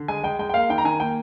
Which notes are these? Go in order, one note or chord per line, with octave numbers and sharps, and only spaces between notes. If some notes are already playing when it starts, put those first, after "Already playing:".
Already playing: D3
G#3 G#5
G#3 G5
G#3 G5
G5
A#3 F5
D#3 G5
A#5
D#3 G#5
A#3 G5